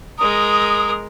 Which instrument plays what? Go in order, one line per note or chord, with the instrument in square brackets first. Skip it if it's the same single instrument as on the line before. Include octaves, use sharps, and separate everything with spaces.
[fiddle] G#3 A#4 [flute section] D#6